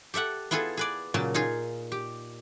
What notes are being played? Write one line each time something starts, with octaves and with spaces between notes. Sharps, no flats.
G4 A4 E5 F#5
B3 E4 F4 G#4 A4
G#4 B4 D5
A#2 C#3 F#3 A5
D#4 F4 G#4
G4